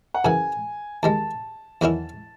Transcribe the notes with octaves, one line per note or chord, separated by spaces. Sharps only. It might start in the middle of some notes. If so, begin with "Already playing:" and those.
F#5
F#2 C#3 E3 G#5
D#2 D#3 G#3 A5
E2 D#3 F#3 C#4 E4